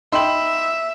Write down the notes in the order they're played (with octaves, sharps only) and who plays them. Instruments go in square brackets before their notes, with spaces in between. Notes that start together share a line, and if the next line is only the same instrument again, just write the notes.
[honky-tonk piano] D#4 F#7 [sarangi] E5 [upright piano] G5 B5 C6